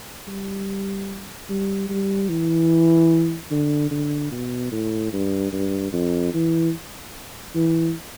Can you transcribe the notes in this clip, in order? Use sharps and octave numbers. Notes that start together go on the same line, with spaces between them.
G3
G3
G3
E3
D3
D3
B2
A2
G2
G2
F2
E3
E3